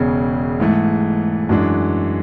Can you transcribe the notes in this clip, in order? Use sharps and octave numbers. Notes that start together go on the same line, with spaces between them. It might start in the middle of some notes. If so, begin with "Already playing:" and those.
Already playing: E1 E2 C#3
G#2 E3 A3
F#2 E3 G#3 D4